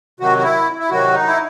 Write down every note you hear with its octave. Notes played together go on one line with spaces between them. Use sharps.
C3 D#3 F#3 F#4
F#4
E4
E4
C3 D#3 F#3 F#4
D#4
E4